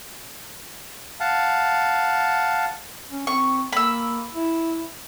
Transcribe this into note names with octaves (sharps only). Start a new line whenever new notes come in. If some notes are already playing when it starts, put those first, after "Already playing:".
F5 F#5 A5
C#4
C4 C#6
A#3 B5 E6
E4